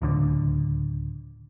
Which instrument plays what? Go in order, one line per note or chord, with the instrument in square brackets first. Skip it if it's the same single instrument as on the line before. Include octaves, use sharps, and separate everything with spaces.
[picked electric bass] D1 C#2 D3